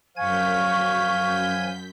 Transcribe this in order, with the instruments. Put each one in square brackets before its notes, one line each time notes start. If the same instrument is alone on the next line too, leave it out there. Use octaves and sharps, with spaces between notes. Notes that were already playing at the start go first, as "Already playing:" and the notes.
[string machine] F#2 G6 B6 [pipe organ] F3 G#5 G#6 [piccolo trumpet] F5 [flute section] C#6